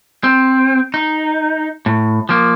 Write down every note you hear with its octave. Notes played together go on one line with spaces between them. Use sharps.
C4
D#4
A2
F3 A#3